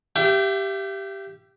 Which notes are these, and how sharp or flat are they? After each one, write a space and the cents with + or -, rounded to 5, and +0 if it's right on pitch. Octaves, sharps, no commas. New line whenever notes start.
G4 +0 E5 +40 G5 -25